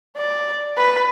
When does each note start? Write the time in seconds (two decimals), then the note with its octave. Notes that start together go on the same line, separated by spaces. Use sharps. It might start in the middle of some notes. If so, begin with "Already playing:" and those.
0.17 D5
0.77 B4